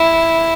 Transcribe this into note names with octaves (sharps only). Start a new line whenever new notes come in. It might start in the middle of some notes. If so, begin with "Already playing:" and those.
Already playing: E4